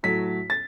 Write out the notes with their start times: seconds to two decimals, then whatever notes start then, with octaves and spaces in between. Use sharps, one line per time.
0.03 A2 F#3 A3 B6
0.50 A6